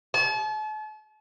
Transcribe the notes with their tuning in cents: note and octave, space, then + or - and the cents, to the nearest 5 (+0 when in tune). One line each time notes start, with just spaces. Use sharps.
A5 -40